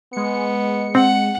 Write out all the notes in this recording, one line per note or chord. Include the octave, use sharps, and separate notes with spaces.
G#3 B3 C#7
C4 F#5